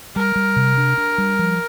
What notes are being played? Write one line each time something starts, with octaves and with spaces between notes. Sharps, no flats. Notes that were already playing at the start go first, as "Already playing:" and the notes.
G3 A#4
G3
C3
D4
D4
G3
F3